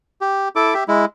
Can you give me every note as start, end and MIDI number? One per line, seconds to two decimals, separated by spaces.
0.21 0.49 67
0.56 0.74 64
0.56 0.74 69
0.56 0.74 86
0.74 0.84 67
0.74 0.84 76
0.88 1.05 56
0.88 1.05 64